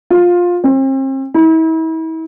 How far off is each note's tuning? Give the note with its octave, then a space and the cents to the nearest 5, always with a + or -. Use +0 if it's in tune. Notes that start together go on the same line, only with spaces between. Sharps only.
F4 +15
C4 +40
E4 -40